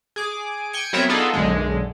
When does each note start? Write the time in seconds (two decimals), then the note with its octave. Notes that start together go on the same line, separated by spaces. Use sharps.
0.16 G#4 D6
0.73 G5 G#5 C#7
0.93 F#3 B3 C4 A#4 C#5 E5
1.09 B3 D4 D#4 F4 G#4 A4
1.33 B1 F#2 D3 G#3